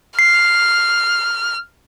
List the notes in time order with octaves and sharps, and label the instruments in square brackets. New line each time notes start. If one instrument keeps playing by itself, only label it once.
[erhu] F6 [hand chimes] C7